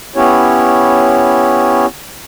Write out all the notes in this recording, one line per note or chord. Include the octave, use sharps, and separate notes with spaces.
B3 C#4 E4 G4 C#5